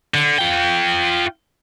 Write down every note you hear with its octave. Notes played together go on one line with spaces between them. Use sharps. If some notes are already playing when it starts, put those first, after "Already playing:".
D3
F4 G5